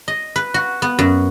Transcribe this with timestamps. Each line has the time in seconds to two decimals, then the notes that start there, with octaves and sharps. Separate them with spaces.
0.08 D#5
0.36 B4
0.54 F#4
0.82 B3
0.99 F#2